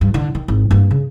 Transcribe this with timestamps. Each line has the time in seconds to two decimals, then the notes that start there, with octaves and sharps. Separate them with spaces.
0.01 G2
0.14 D3
0.35 D#3
0.48 G#1
0.71 G2 A#3
0.91 C#3